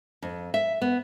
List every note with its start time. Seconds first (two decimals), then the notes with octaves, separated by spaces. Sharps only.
0.22 F2
0.54 E5
0.82 B3